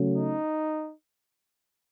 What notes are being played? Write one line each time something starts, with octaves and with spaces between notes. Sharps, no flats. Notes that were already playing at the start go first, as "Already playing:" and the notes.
Already playing: C#3 F#3 A3 C#4
D#4